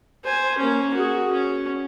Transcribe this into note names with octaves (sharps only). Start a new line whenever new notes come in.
C5 G#5
A#3 C#4
F#4 G#4
C#4